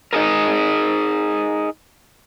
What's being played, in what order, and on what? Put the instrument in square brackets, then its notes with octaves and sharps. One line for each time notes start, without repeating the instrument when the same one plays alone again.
[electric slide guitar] D#4 G#4 A#4